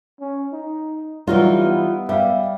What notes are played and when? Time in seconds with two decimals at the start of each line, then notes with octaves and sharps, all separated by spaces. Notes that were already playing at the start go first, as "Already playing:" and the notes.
0.20 C#4
0.53 D#4
1.27 E3 F#3 G3 D#4 F4
1.65 B3
2.09 G3 E5 F5